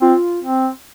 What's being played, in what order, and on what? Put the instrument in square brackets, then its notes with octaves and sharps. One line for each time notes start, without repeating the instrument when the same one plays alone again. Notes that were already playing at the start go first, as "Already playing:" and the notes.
[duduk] C4 [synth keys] F4
[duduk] C4